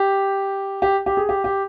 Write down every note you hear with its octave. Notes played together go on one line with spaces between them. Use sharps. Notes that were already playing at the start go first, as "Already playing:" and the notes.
Already playing: G4
G4
G4
G#4
G4
G4